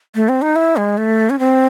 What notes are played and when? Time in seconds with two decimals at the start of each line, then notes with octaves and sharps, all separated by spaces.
0.15 A3
0.29 C4
0.42 D#4
0.56 E4
0.77 G#3
0.98 A3
1.30 C#4
1.39 C4